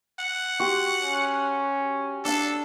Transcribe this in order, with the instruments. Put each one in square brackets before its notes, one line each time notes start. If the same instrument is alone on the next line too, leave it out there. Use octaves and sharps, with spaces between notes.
[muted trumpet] F#5
[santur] F#4 G4 C6
[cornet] C#4
[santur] D4 F5 [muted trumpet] A4